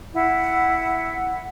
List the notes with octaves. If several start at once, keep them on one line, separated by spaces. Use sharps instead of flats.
E4 F#5